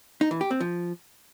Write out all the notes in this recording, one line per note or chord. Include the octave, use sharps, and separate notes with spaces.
D#4
E3
G4
C4
F3